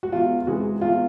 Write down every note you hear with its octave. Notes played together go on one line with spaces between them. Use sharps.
F#4
E2 F4
C3 E3 G#3 F#4
E2 F4